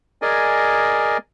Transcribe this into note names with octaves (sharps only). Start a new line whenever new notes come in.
G#4 A#4 D5 D#5 G#5